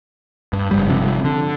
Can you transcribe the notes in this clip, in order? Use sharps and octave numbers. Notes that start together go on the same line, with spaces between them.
G2
F#1 G#2 G3
G1 C3 F3
D3